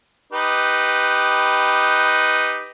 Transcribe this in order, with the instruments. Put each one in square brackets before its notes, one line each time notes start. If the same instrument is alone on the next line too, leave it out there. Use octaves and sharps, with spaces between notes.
[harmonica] D#4 G4 B4